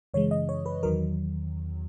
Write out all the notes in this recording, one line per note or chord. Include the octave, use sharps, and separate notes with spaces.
F#2 C#3 E3 G#3 C#5
D#5
C#5
B4
E2 D#3 F#3 A#4